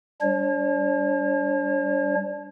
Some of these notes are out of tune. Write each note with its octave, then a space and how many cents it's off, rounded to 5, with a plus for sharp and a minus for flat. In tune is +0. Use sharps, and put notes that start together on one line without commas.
G3 +0 D4 -25 C#5 -45